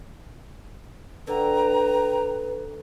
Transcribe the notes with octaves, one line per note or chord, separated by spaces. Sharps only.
D3 B4 G5 A#5